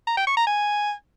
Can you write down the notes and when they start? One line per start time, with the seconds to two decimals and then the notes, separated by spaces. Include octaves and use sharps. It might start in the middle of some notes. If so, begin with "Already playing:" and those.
0.07 A#5
0.17 G5
0.27 C#6
0.37 A#5
0.47 G#5